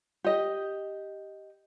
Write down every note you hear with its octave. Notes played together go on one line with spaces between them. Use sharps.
G4 D#5